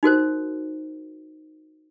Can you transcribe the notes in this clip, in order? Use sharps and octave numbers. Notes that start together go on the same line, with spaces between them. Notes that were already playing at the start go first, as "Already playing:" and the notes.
D#4 F#4 A#4 C5